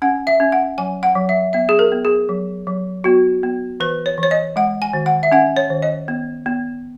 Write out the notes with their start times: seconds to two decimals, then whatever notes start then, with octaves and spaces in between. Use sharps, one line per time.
0.02 C#4 F#5
0.27 E5
0.40 C#4
0.52 F#5
0.78 F#3 G#5
1.03 F#5
1.15 F#3
1.29 E5
1.53 B3 E5
1.69 G#4
1.79 A#4
1.92 B3
2.05 G#4
2.29 F#3
2.67 F#3
3.04 B3 F#4
3.43 B3
3.80 E3 B4
4.06 C#5
4.18 E3
4.23 C#5
4.31 D#5
4.56 G#3 F#5
4.82 G#5
4.93 D#3
5.06 F#5
5.23 E5
5.32 C#4 F#5
5.57 C#5
5.70 D#3
5.82 D#5
6.08 B3
6.46 B3